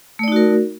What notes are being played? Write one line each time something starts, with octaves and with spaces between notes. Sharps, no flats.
A3 D#4 F#4 A#4 D5